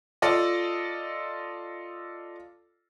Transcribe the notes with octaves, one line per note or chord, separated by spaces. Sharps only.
F4 A4 D5 D#5